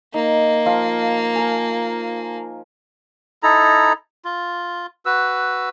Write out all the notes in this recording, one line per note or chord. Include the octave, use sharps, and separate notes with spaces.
A#3 D#4
F3 F4 F5
A#4 G#5
D#4 E4 A4 A#5
F4
F#4 B4 E6